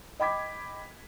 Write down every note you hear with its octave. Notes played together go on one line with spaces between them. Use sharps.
D#5 G5 B5 D6 G#6 B6